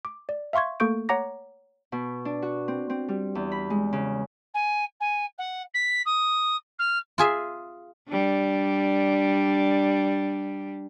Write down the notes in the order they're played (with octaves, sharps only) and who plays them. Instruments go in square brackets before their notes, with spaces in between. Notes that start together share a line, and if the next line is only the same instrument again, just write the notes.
[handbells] D6
D5
E5 F5 C6 C#6 G#6
A3 A#3 A4 C#6 G6 D7
C#5 F#5 A#5 D6 A#6
[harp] B2
D4
F#4
C4
C4
G3
E2
B5
G#3
C#3
[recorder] G#5
G#5
F#5
B6
D#6
F6
[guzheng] F4 G#4 E5
[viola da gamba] G3 D4